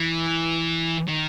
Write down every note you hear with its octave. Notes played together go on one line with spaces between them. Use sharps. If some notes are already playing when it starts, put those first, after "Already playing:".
Already playing: E3
D#3